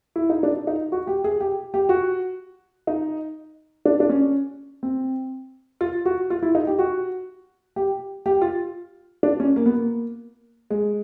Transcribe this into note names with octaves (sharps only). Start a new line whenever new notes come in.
E4
D#4
D4
D#4
F#4
G4
G#4
G4
G4
F#4
D#4
D4
D4
C#4
C4
F4
F#4
F4
E4
D#4
G4
F#4
G4
G4
F4
D4
C#4
A#3
B3
A#3
G#3